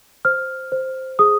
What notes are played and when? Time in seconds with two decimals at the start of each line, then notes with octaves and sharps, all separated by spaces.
0.25 C5 F6
0.72 C5
1.19 G#4 D#6